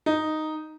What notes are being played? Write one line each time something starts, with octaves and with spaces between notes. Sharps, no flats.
D#4